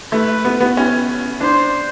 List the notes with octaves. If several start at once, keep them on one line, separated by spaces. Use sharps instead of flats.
A3 B4
B3
B3
C#4
D4 C5